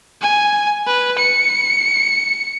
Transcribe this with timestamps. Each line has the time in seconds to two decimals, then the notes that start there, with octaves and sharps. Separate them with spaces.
0.22 G#5
0.87 B4
1.19 C#7